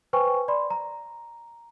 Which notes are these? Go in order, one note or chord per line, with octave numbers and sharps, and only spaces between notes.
B4 C5 G5 G#5 C#6
D5 B5 C6
A#5